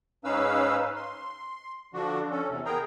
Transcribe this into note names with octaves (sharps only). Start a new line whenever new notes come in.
G#2 C#4 D#4 B4 F5 E6
C6
D3 F3 D4 F#4
C#4 A4
E2 C3
B3 G#4 A#4 G5 A#5